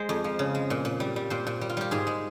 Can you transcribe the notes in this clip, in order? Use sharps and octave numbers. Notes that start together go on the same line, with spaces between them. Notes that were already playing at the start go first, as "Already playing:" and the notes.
Already playing: G#3 C5
F2
F3
C#3
G#3
A#2
A#2
G3
G3
A#2 C5
A#2
G3
F4
G3 G4
G#2 G#4
G#3